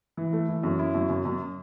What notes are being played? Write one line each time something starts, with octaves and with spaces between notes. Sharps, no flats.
E3
A3
E3
F#2
E4
F#2
F#2
F#2